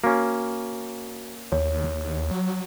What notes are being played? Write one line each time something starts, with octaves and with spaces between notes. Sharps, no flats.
A#3 C#4 F#4
D#2 C#5
F#3